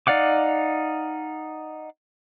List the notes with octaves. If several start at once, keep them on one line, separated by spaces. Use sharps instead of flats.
D#4 D5 F5 F#5 D6